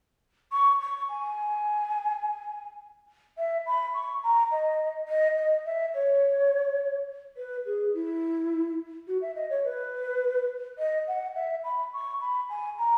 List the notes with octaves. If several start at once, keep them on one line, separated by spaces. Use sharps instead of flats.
C#6
C#6
G#5
E5
B5
C#6
A#5
D#5
D#5
D#5
E5
C#5
B4
G#4
E4
F#4
E5
D#5
C#5
B4
D#5
F#5
E5
B5
C#6
B5
G#5
A#5